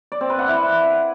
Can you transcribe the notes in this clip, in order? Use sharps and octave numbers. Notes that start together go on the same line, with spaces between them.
D5
C4
B4
F#5
E4